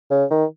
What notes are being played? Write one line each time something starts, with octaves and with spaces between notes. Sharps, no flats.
C#3
D#3